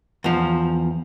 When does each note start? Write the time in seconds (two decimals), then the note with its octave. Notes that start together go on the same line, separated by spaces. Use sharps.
0.24 E2 F3